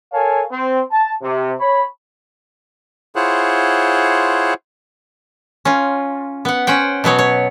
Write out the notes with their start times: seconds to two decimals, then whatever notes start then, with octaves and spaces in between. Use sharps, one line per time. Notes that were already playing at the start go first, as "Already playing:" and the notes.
0.13 A4 A#4 C#5 F5 G#5 A5
0.51 C4 C6
0.91 A5
1.23 C3
1.59 C#5 B5
3.16 E4 F4 G#4 C5 C#5 F#5
5.65 C#4 F4
6.45 B3 F#5
6.67 C#4 C5 F#5 G5
7.04 B2 F#3 B3 C#5
7.19 C#5